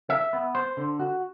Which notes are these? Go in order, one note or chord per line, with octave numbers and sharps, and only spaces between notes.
E5
B3
C5
D3
F#4